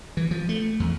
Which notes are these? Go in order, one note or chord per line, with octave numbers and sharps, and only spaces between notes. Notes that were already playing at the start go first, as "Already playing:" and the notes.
E3
F3
A3
E2